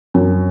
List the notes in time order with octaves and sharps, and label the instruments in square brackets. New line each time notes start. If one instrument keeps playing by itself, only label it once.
[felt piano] F#2